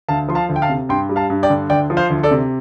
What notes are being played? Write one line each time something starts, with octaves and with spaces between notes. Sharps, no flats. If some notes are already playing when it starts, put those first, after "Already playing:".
D2 F5 A5
F3 C6
F5 A5
D2
G5
F5 A5
C3
G2 G5 C6
G3
F5 A5
G2
D5 G5
D3
D2 D5 G5
F3
C5 F5
D2
A4 D5
C3